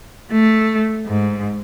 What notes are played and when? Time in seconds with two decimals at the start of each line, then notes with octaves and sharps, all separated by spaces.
0.31 A3
1.06 G#2